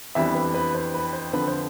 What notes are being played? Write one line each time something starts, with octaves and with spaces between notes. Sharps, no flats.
F2 E3 G3 B3 D4 E5
B4
B4
C5
B4
C5
F2 D3 F3 B4
C5